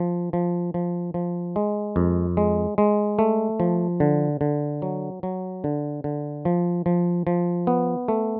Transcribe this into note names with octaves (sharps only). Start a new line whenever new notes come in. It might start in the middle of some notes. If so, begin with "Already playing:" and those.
Already playing: F3
F3
F3
F3
G#3
F2
G#3
G#3
A3
F3
D3
D3
F#3
F#3
D3
D3
F3
F3
F3
B3
A3